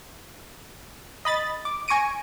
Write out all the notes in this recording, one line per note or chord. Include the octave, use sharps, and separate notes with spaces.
D#5 B5 A6
D6
G#5 C#6 A#6 D7 D#7